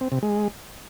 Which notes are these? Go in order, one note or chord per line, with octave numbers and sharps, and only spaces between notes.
C4
C3
G#3